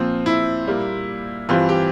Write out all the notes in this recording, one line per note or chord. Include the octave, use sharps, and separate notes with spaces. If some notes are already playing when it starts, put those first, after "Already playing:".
Already playing: A#2 F3 C4
E4
A#2 G3 A#3
G2 E3 G3 C4 F4
G4